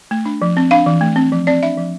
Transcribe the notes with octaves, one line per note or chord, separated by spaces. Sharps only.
A3
D4
F3
C4
D4 F5
E3
A3
C4
F3
C4 D5
D4 E5
F3